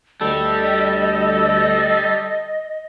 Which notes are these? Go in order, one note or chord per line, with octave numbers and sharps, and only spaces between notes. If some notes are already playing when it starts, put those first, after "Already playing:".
D2 G3 A4 D#5